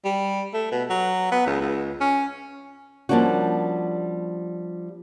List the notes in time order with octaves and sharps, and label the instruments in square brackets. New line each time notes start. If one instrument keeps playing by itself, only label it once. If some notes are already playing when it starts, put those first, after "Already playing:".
[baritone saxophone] G3
A3
B2
F#3
B3
C#2
C#2
C#4
[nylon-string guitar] F3 G3 A#3 C#4 D4 F#4